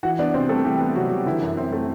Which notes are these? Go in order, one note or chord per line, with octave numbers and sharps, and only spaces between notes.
E3 F#4 F#5
B3 D4 D5
C3 C4 C5
G3 A3 A4
E3 G3 G4
B3
C3 F#3 F#4
G3
D3 E3 E4
F#2
F#2 C4
A3